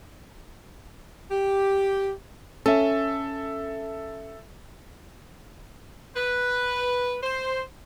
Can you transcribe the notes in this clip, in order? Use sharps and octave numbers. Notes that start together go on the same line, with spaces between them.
G4
C#4 A4 E5
B4
C5